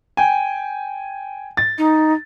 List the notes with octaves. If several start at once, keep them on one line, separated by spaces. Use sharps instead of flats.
G5 G#5
A6
D#4